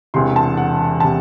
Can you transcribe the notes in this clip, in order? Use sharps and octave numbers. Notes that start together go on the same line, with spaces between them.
E1 E2 C3 C6
A5
F#5
C3 A5